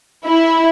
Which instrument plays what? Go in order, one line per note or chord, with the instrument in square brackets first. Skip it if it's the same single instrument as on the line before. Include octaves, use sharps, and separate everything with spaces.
[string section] E4